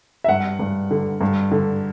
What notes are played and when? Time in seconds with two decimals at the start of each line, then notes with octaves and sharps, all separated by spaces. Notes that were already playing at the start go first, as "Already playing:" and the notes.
0.24 E5
0.28 G2 F#5
0.59 G2
0.91 D3
1.21 G2
1.51 D3